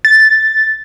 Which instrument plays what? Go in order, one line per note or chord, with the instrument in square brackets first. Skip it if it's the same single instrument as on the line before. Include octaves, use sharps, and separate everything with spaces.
[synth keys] A6